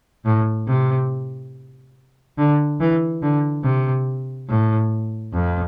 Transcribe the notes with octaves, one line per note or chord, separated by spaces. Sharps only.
A2
C3
D3
E3
D3
C3
A2
F2